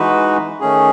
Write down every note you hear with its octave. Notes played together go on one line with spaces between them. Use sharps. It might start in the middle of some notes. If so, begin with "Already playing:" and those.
Already playing: E3 G#3 D#4 F#4 B4
D#3 A3 C#4 G#4